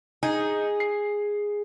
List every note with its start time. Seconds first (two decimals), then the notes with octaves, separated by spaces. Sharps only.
0.23 D#4 G#4
0.80 C7